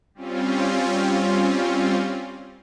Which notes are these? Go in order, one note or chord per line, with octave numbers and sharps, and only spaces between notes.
G3 C4 C#4 F4